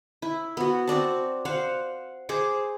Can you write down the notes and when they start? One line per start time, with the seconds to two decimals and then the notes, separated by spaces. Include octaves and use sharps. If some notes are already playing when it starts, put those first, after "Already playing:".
0.22 E4
0.57 B3 F#4
0.88 C4 F#4 D5 A5
1.45 C5 F5 F#5
2.29 G#4 C5 D6